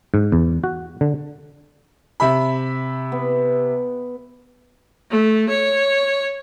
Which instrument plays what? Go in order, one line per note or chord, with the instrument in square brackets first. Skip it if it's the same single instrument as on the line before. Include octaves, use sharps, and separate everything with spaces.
[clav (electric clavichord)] G#2
E2
F#4
D3
[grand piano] C3 E5 B5
[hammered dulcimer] B3
[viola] A3
C#5